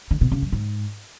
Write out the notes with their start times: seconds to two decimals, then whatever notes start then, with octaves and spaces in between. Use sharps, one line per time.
0.11 D3
0.21 B2
0.32 C#3
0.42 F#2
0.53 G#2